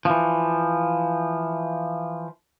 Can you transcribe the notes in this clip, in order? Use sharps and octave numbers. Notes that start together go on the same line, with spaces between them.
E3 F3